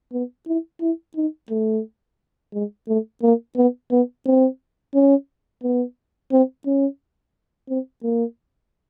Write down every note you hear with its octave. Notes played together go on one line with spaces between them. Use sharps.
B3
E4
E4
D#4
A3
G#3
A3
A#3
B3
B3
C4
C#4
B3
C4
C#4
C4
A#3